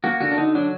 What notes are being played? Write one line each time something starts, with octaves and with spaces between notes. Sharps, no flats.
A#3 F#4
D3 F#4
D4
D3 D#4
F#3 D4